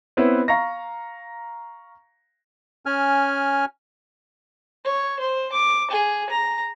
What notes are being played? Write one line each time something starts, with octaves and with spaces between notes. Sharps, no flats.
B3 C4 E4 B4 C#5
F5 A#5 C#6 A#6
C#4 G#5 F6
C#5
C5
D6
G#4
A#5